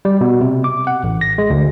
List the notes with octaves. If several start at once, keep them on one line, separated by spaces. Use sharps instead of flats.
G3
B2
C3
D6
F#5
A1
A#6
G#3
D2